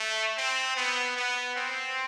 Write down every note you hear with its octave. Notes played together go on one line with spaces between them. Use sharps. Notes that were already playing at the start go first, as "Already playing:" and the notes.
Already playing: A3
C4
B3
B3
C4